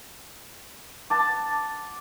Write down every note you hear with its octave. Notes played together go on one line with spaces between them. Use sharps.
F#5 A5 D6